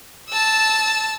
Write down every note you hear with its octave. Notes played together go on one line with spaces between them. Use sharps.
A5 E6